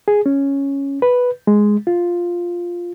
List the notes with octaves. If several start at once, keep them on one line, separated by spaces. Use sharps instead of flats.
G#4
C#4
B4
G#3
F4